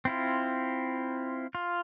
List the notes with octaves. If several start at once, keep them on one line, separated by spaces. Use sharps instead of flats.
C4 E4 F4
F4